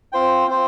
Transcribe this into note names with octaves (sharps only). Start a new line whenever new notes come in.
C4 F4 C5 G5
C4 F4 C5 G5